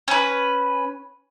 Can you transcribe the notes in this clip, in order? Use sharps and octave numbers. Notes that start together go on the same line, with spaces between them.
C#4 B4